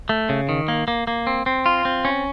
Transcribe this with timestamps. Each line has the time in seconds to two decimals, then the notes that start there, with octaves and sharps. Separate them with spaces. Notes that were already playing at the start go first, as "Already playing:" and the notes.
0.09 A3
0.29 C#3
0.49 D#3
0.68 A#3
0.88 A#3
1.07 A#3
1.27 C4
1.46 C4
1.66 F4
1.85 C4
2.05 C#4